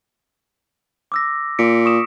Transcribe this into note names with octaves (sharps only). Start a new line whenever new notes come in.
D6 E6 A#6
A#2 B6 C#7 D7
C#6 D#6 E7